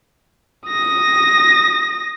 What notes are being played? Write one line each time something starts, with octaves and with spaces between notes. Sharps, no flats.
D#6 A#6